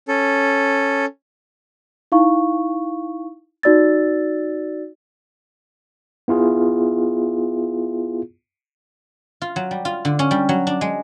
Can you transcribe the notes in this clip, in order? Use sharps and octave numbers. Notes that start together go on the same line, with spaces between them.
C#4 A4
D#4 E4 F5 C#6
D#4 F#4 D5 E6 A6
B3 E4 F4 G#4
F4
F#3
G3
F4
D3
C#4
G3
F#3
D4
G#3